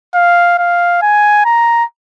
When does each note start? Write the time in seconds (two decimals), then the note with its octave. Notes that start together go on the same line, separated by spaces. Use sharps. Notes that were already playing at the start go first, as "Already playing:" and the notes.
0.15 F5
0.58 F5
1.02 G#5
1.45 A#5